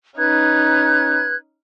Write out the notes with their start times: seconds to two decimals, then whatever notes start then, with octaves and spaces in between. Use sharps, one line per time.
0.18 C#4 D#4 B4 F#6 G#6